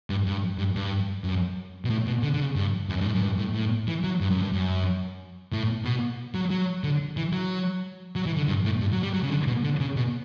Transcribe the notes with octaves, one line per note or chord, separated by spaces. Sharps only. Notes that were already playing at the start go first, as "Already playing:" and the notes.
G2
G2
G2
G2
F#2
B2
A2
B2
D3
D3
C#3
G2
F#2
G2
A2
F#2
G2
A2
A2
E3
F#3
G2
F#2
G2
F#2
A2
B2
F#3
F#3
D3
E3
F#3
F#3
E3
D3
G2
A2
G2
F#3
G3
F#3
C#3
D3
B2
D3
C#3
B2